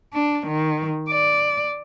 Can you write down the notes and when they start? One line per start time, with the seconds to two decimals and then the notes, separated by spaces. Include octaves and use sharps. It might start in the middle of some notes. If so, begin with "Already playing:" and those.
0.14 D4
0.47 D#3
1.10 D5